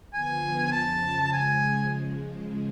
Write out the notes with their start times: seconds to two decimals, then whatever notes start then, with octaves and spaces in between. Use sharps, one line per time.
0.13 D3 F3 B3 F4 G#5
0.72 F2 C#3 F3 A5
1.33 C#3 F3 G#3 G#5